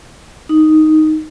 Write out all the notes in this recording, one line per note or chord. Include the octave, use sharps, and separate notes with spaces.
D#4